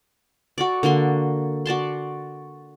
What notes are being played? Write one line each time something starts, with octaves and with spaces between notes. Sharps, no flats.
F#4 A4 D5
D3 A#3 F#4 C6
F#4 D5 A5 C6